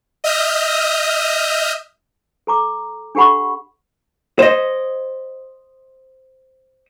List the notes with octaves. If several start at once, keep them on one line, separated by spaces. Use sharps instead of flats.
D#5 E5 D#6 F6 G6
A4 A#5 D6
D4 G4 A4 F#5 B5 C#6
C5 D#5